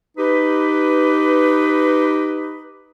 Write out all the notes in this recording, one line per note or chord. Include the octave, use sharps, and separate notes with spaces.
D#4 G4 B4